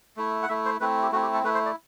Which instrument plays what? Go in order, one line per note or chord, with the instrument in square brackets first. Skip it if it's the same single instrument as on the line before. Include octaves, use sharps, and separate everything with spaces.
[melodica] A3 E4
F#5
A3 E4 E5
C5
A3 C4 E4 B4
G4
A3 C4 E4 F#4
G4
A4
A3 E4 B4
C5
D5